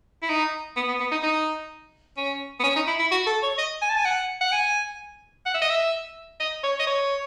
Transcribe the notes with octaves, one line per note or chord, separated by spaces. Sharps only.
E4
D#4
B3
B3
B3
D#4
D#4
C#4
B3
C#4
D#4
E4
E4
F#4
A4
C#5
D#5
G#5
A5
G#5
F#5
F#5
G#5
F#5
E5
D#5
E5
D#5
C#5
D#5
C#5